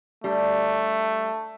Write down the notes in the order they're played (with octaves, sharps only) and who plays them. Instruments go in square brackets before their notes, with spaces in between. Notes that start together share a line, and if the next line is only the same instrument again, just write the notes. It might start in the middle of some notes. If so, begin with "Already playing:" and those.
[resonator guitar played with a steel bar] G3 D4 [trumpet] A3